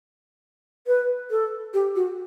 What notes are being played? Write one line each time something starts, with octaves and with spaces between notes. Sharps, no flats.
B4
A4
G4
F#4